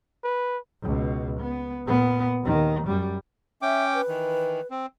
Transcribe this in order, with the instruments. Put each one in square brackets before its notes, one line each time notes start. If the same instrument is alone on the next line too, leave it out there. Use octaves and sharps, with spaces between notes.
[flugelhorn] B4
[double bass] C#2 B2
B3
A#2 B3
D#2 D#3
F#2 G3
[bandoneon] C#4 G5 D6 [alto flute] E5
[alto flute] B4
[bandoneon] D#3 E3
C4